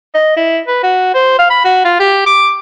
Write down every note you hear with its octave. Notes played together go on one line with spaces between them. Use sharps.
D#5
E4
B4
F#4
C5
F5
B5
F#4
F4
G4
D6